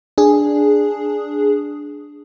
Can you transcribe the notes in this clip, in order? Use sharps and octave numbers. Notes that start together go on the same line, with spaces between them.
D4 G#4